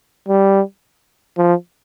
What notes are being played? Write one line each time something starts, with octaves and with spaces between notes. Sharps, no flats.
G3
F3